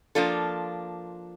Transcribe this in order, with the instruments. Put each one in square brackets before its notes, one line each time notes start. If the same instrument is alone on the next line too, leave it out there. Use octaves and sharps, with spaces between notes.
[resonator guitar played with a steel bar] F3 A#3 D4 F4 A4